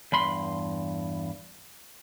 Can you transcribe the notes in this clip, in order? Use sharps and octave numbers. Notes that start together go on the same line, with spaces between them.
E2 G2 B5 C6